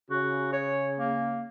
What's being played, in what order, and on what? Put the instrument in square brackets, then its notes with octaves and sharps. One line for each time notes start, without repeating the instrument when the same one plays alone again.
[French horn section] C#3 [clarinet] F#4
[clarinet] C#5
A#3